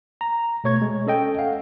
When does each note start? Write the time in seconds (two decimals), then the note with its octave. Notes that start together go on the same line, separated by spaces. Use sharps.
0.21 A#5
0.64 B2 A3 C#5 C#6 G#6
0.82 G#3
1.07 C#4 A4 D#5 G5
1.39 F5 F#5